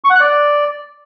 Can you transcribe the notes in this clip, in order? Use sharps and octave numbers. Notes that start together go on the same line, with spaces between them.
C#6
F#5
F#6
D5